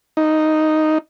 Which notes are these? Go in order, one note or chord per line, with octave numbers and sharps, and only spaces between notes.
D#4